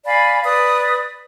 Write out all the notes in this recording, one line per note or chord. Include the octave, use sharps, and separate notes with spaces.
D5 F5 G#5 B5
B4 D5 D#6